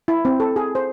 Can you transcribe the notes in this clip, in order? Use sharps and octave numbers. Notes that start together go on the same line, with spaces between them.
E4
C4
A4
G#4
C5